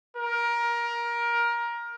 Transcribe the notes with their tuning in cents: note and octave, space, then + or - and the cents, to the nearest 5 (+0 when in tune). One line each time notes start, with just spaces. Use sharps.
A#4 +20